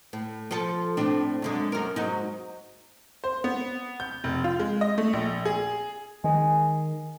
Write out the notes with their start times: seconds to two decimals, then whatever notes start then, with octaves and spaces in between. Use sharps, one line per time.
0.13 A2
0.51 F3 A4
0.97 A2 C4 D4
1.42 F#2 D3 G#3
1.72 F#2 A#4
1.96 G#2 F#3 D#4
3.24 C5
3.44 B3
4.00 G6
4.24 F1
4.44 F4
4.59 G#3
4.81 D#5
4.98 A3
5.13 A#1
5.45 G#4
6.24 D#3 G#3